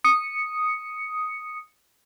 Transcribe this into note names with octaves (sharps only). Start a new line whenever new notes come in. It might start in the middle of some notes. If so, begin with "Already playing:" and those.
D#6 C#7